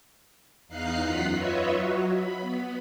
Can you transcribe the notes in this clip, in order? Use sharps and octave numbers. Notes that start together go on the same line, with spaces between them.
E2 D#4 F5 F#6 C7
F#2 F4 F#5 B6 C7
F4 B4 C#5 D#5 E5
F#3 F#4
B5
B3